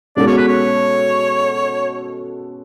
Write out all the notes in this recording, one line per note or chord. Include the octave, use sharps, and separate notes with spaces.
B2 G#3 C#4 F#4 A4 D5
C#5
B4
C#5